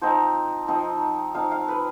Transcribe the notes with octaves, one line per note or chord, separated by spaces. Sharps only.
F3 C4 D#4 C5
F3 C4 D#4
F3 C4 D#4 F5
F5
B4